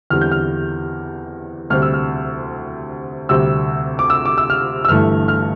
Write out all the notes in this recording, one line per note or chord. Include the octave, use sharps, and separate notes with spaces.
E2 D3 G3 C4 F6
G6
F6
D2 C3 G3 C4 F6
E6
F6
D2 C3 G3 C4 E6
D6
E6
D6
E6
F6
E6
G1 G2 E3 A3 F6
F6